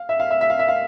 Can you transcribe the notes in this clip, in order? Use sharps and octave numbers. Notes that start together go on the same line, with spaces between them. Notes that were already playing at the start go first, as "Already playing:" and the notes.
Already playing: F5
E5
F5
E5
E5
F5
E5
F5